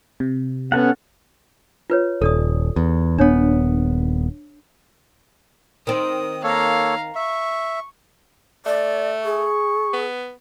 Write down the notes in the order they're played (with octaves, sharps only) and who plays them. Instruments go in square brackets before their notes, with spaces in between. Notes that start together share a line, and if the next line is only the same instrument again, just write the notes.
[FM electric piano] C3
[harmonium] B3 [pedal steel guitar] C#4 A4 F#5
[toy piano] F4 B4 C#5
[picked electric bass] D#1 [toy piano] A4 D5 D#6
[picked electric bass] E2
[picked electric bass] D#1 B3 [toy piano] D4 C#5
[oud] D#3 C4 [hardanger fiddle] D#6
[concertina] A#3 A4 C#5 [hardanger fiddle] F5 A#5
[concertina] E5 [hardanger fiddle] C#6
[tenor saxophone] A3 [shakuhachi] D5
[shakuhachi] G#4 [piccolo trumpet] C#6
[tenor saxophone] B3